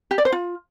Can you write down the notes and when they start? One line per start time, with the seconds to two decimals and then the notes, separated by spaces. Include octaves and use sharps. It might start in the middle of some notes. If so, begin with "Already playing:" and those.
0.11 G4
0.18 D5
0.25 C5
0.32 F4